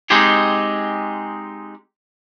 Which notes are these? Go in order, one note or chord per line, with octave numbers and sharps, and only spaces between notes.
G#3 C4 D#4 G4 G#4